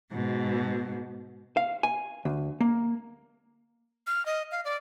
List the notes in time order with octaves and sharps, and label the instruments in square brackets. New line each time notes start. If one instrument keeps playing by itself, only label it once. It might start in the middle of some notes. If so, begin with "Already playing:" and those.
[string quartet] G#2 B2
[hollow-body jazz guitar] F5
G#5
D2
A#3
[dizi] F6
D#5
F5
D5